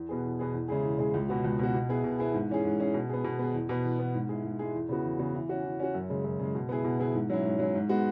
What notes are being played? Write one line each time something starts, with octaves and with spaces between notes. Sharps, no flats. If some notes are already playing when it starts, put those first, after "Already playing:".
Already playing: E2
B2 B3 G#4
E2
B2 B3 G#4
E2
C#3 G#3 E4 G#4
E2
C#3 G#3 E4 G#4
C#2
B2 B3 F#4
C#2
B2 B3 F#4
B2
B3 E4 G#4
B2
B3 E4 G#4
G#2
E3 C#4 G#4
G#2
E3 C#4 G#4
B2
B3 G#4
B2
B3 G#4
E2
B2 B3
E2
B2 B3
G#2
G#3 E4 G#4
G#2
G#3 E4 G#4
E2
C#3 E3 B3 F#4
E2
C#3 E3 B3 F#4
E3
C#4 F#4
E3
C#4 F#4
F#2
C#3 G#3
F#2
C#3 G#3
B2
B3 E4 G#4
B2
B3 E4 G#4
G#2
F#3 C#4 E4
G#2
F#3 C#4 E4
G#2
G#3 B3 F#4